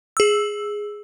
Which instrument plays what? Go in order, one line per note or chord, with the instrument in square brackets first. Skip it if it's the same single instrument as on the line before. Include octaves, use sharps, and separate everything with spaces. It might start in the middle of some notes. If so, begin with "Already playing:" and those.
[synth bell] G#4 E6